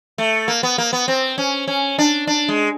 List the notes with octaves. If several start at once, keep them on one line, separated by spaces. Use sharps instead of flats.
A3
A#3
B3
A#3
B3
C4
C#4
C#4
D4
D4
G#3